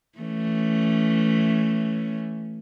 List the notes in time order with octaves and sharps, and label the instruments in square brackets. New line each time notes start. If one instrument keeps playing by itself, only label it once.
[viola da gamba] E3 A3 C#4